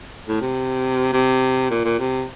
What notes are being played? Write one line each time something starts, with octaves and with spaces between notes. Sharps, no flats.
A2
C3
C3
A#2
A#2
C3